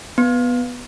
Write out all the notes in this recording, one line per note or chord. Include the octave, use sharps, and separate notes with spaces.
B3